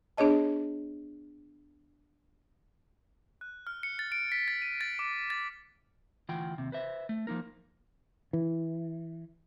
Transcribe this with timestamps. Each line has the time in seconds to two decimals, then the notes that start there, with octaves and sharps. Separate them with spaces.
0.17 B3 D4 G#4 C#5 D#5 A5
3.41 F#6
3.67 F6
3.83 C#7
3.99 A6
4.12 D7
4.32 B6
4.48 A6
4.62 D#7
4.81 A6
4.99 D6
5.30 A6
6.29 D2 E3 F4 F#5 G5
6.58 D#2 C3
6.72 B4 C5 E5
7.09 A3
7.27 F3 A#3 D#4 A#4
8.33 E3